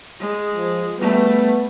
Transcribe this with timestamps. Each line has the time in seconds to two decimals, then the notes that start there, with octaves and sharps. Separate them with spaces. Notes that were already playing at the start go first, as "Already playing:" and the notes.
0.20 G#3
0.54 F3
0.99 G3 A3 B3